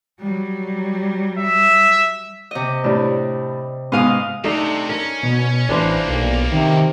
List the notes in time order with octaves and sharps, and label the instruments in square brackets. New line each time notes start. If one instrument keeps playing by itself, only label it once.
[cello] F#3 G3
[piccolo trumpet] E5
[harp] C3 D#5
[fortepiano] A2 G3 D4
[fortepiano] G#2 B2 [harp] D#5 F5 D#6
[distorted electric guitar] C3 [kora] A3 D4 D#4
[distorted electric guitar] C#4 [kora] A#4
[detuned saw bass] B2
[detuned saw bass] A1 [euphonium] E3 [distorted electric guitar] G3 A#3 [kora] D4 B4 C5
[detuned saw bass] B1 [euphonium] A#2
[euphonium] C3 [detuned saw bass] D#3